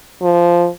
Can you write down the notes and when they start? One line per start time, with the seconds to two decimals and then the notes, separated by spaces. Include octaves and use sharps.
0.22 F3